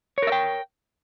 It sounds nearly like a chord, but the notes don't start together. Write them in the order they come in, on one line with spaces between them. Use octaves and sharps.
C#5 A#4 E5 G5